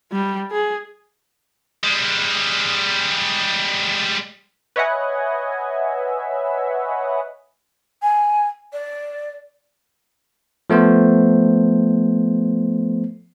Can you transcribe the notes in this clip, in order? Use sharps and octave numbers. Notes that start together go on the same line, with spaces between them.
G3
G#4
G3 G#3
B4 C#5 D#5 E5 F#5 G#5
G#5
D5
F3 A3 B3 C5